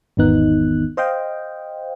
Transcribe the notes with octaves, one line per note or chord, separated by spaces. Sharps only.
G#1 E2 D#3 B3 D#4 F#6
C5 D#5 F5 G5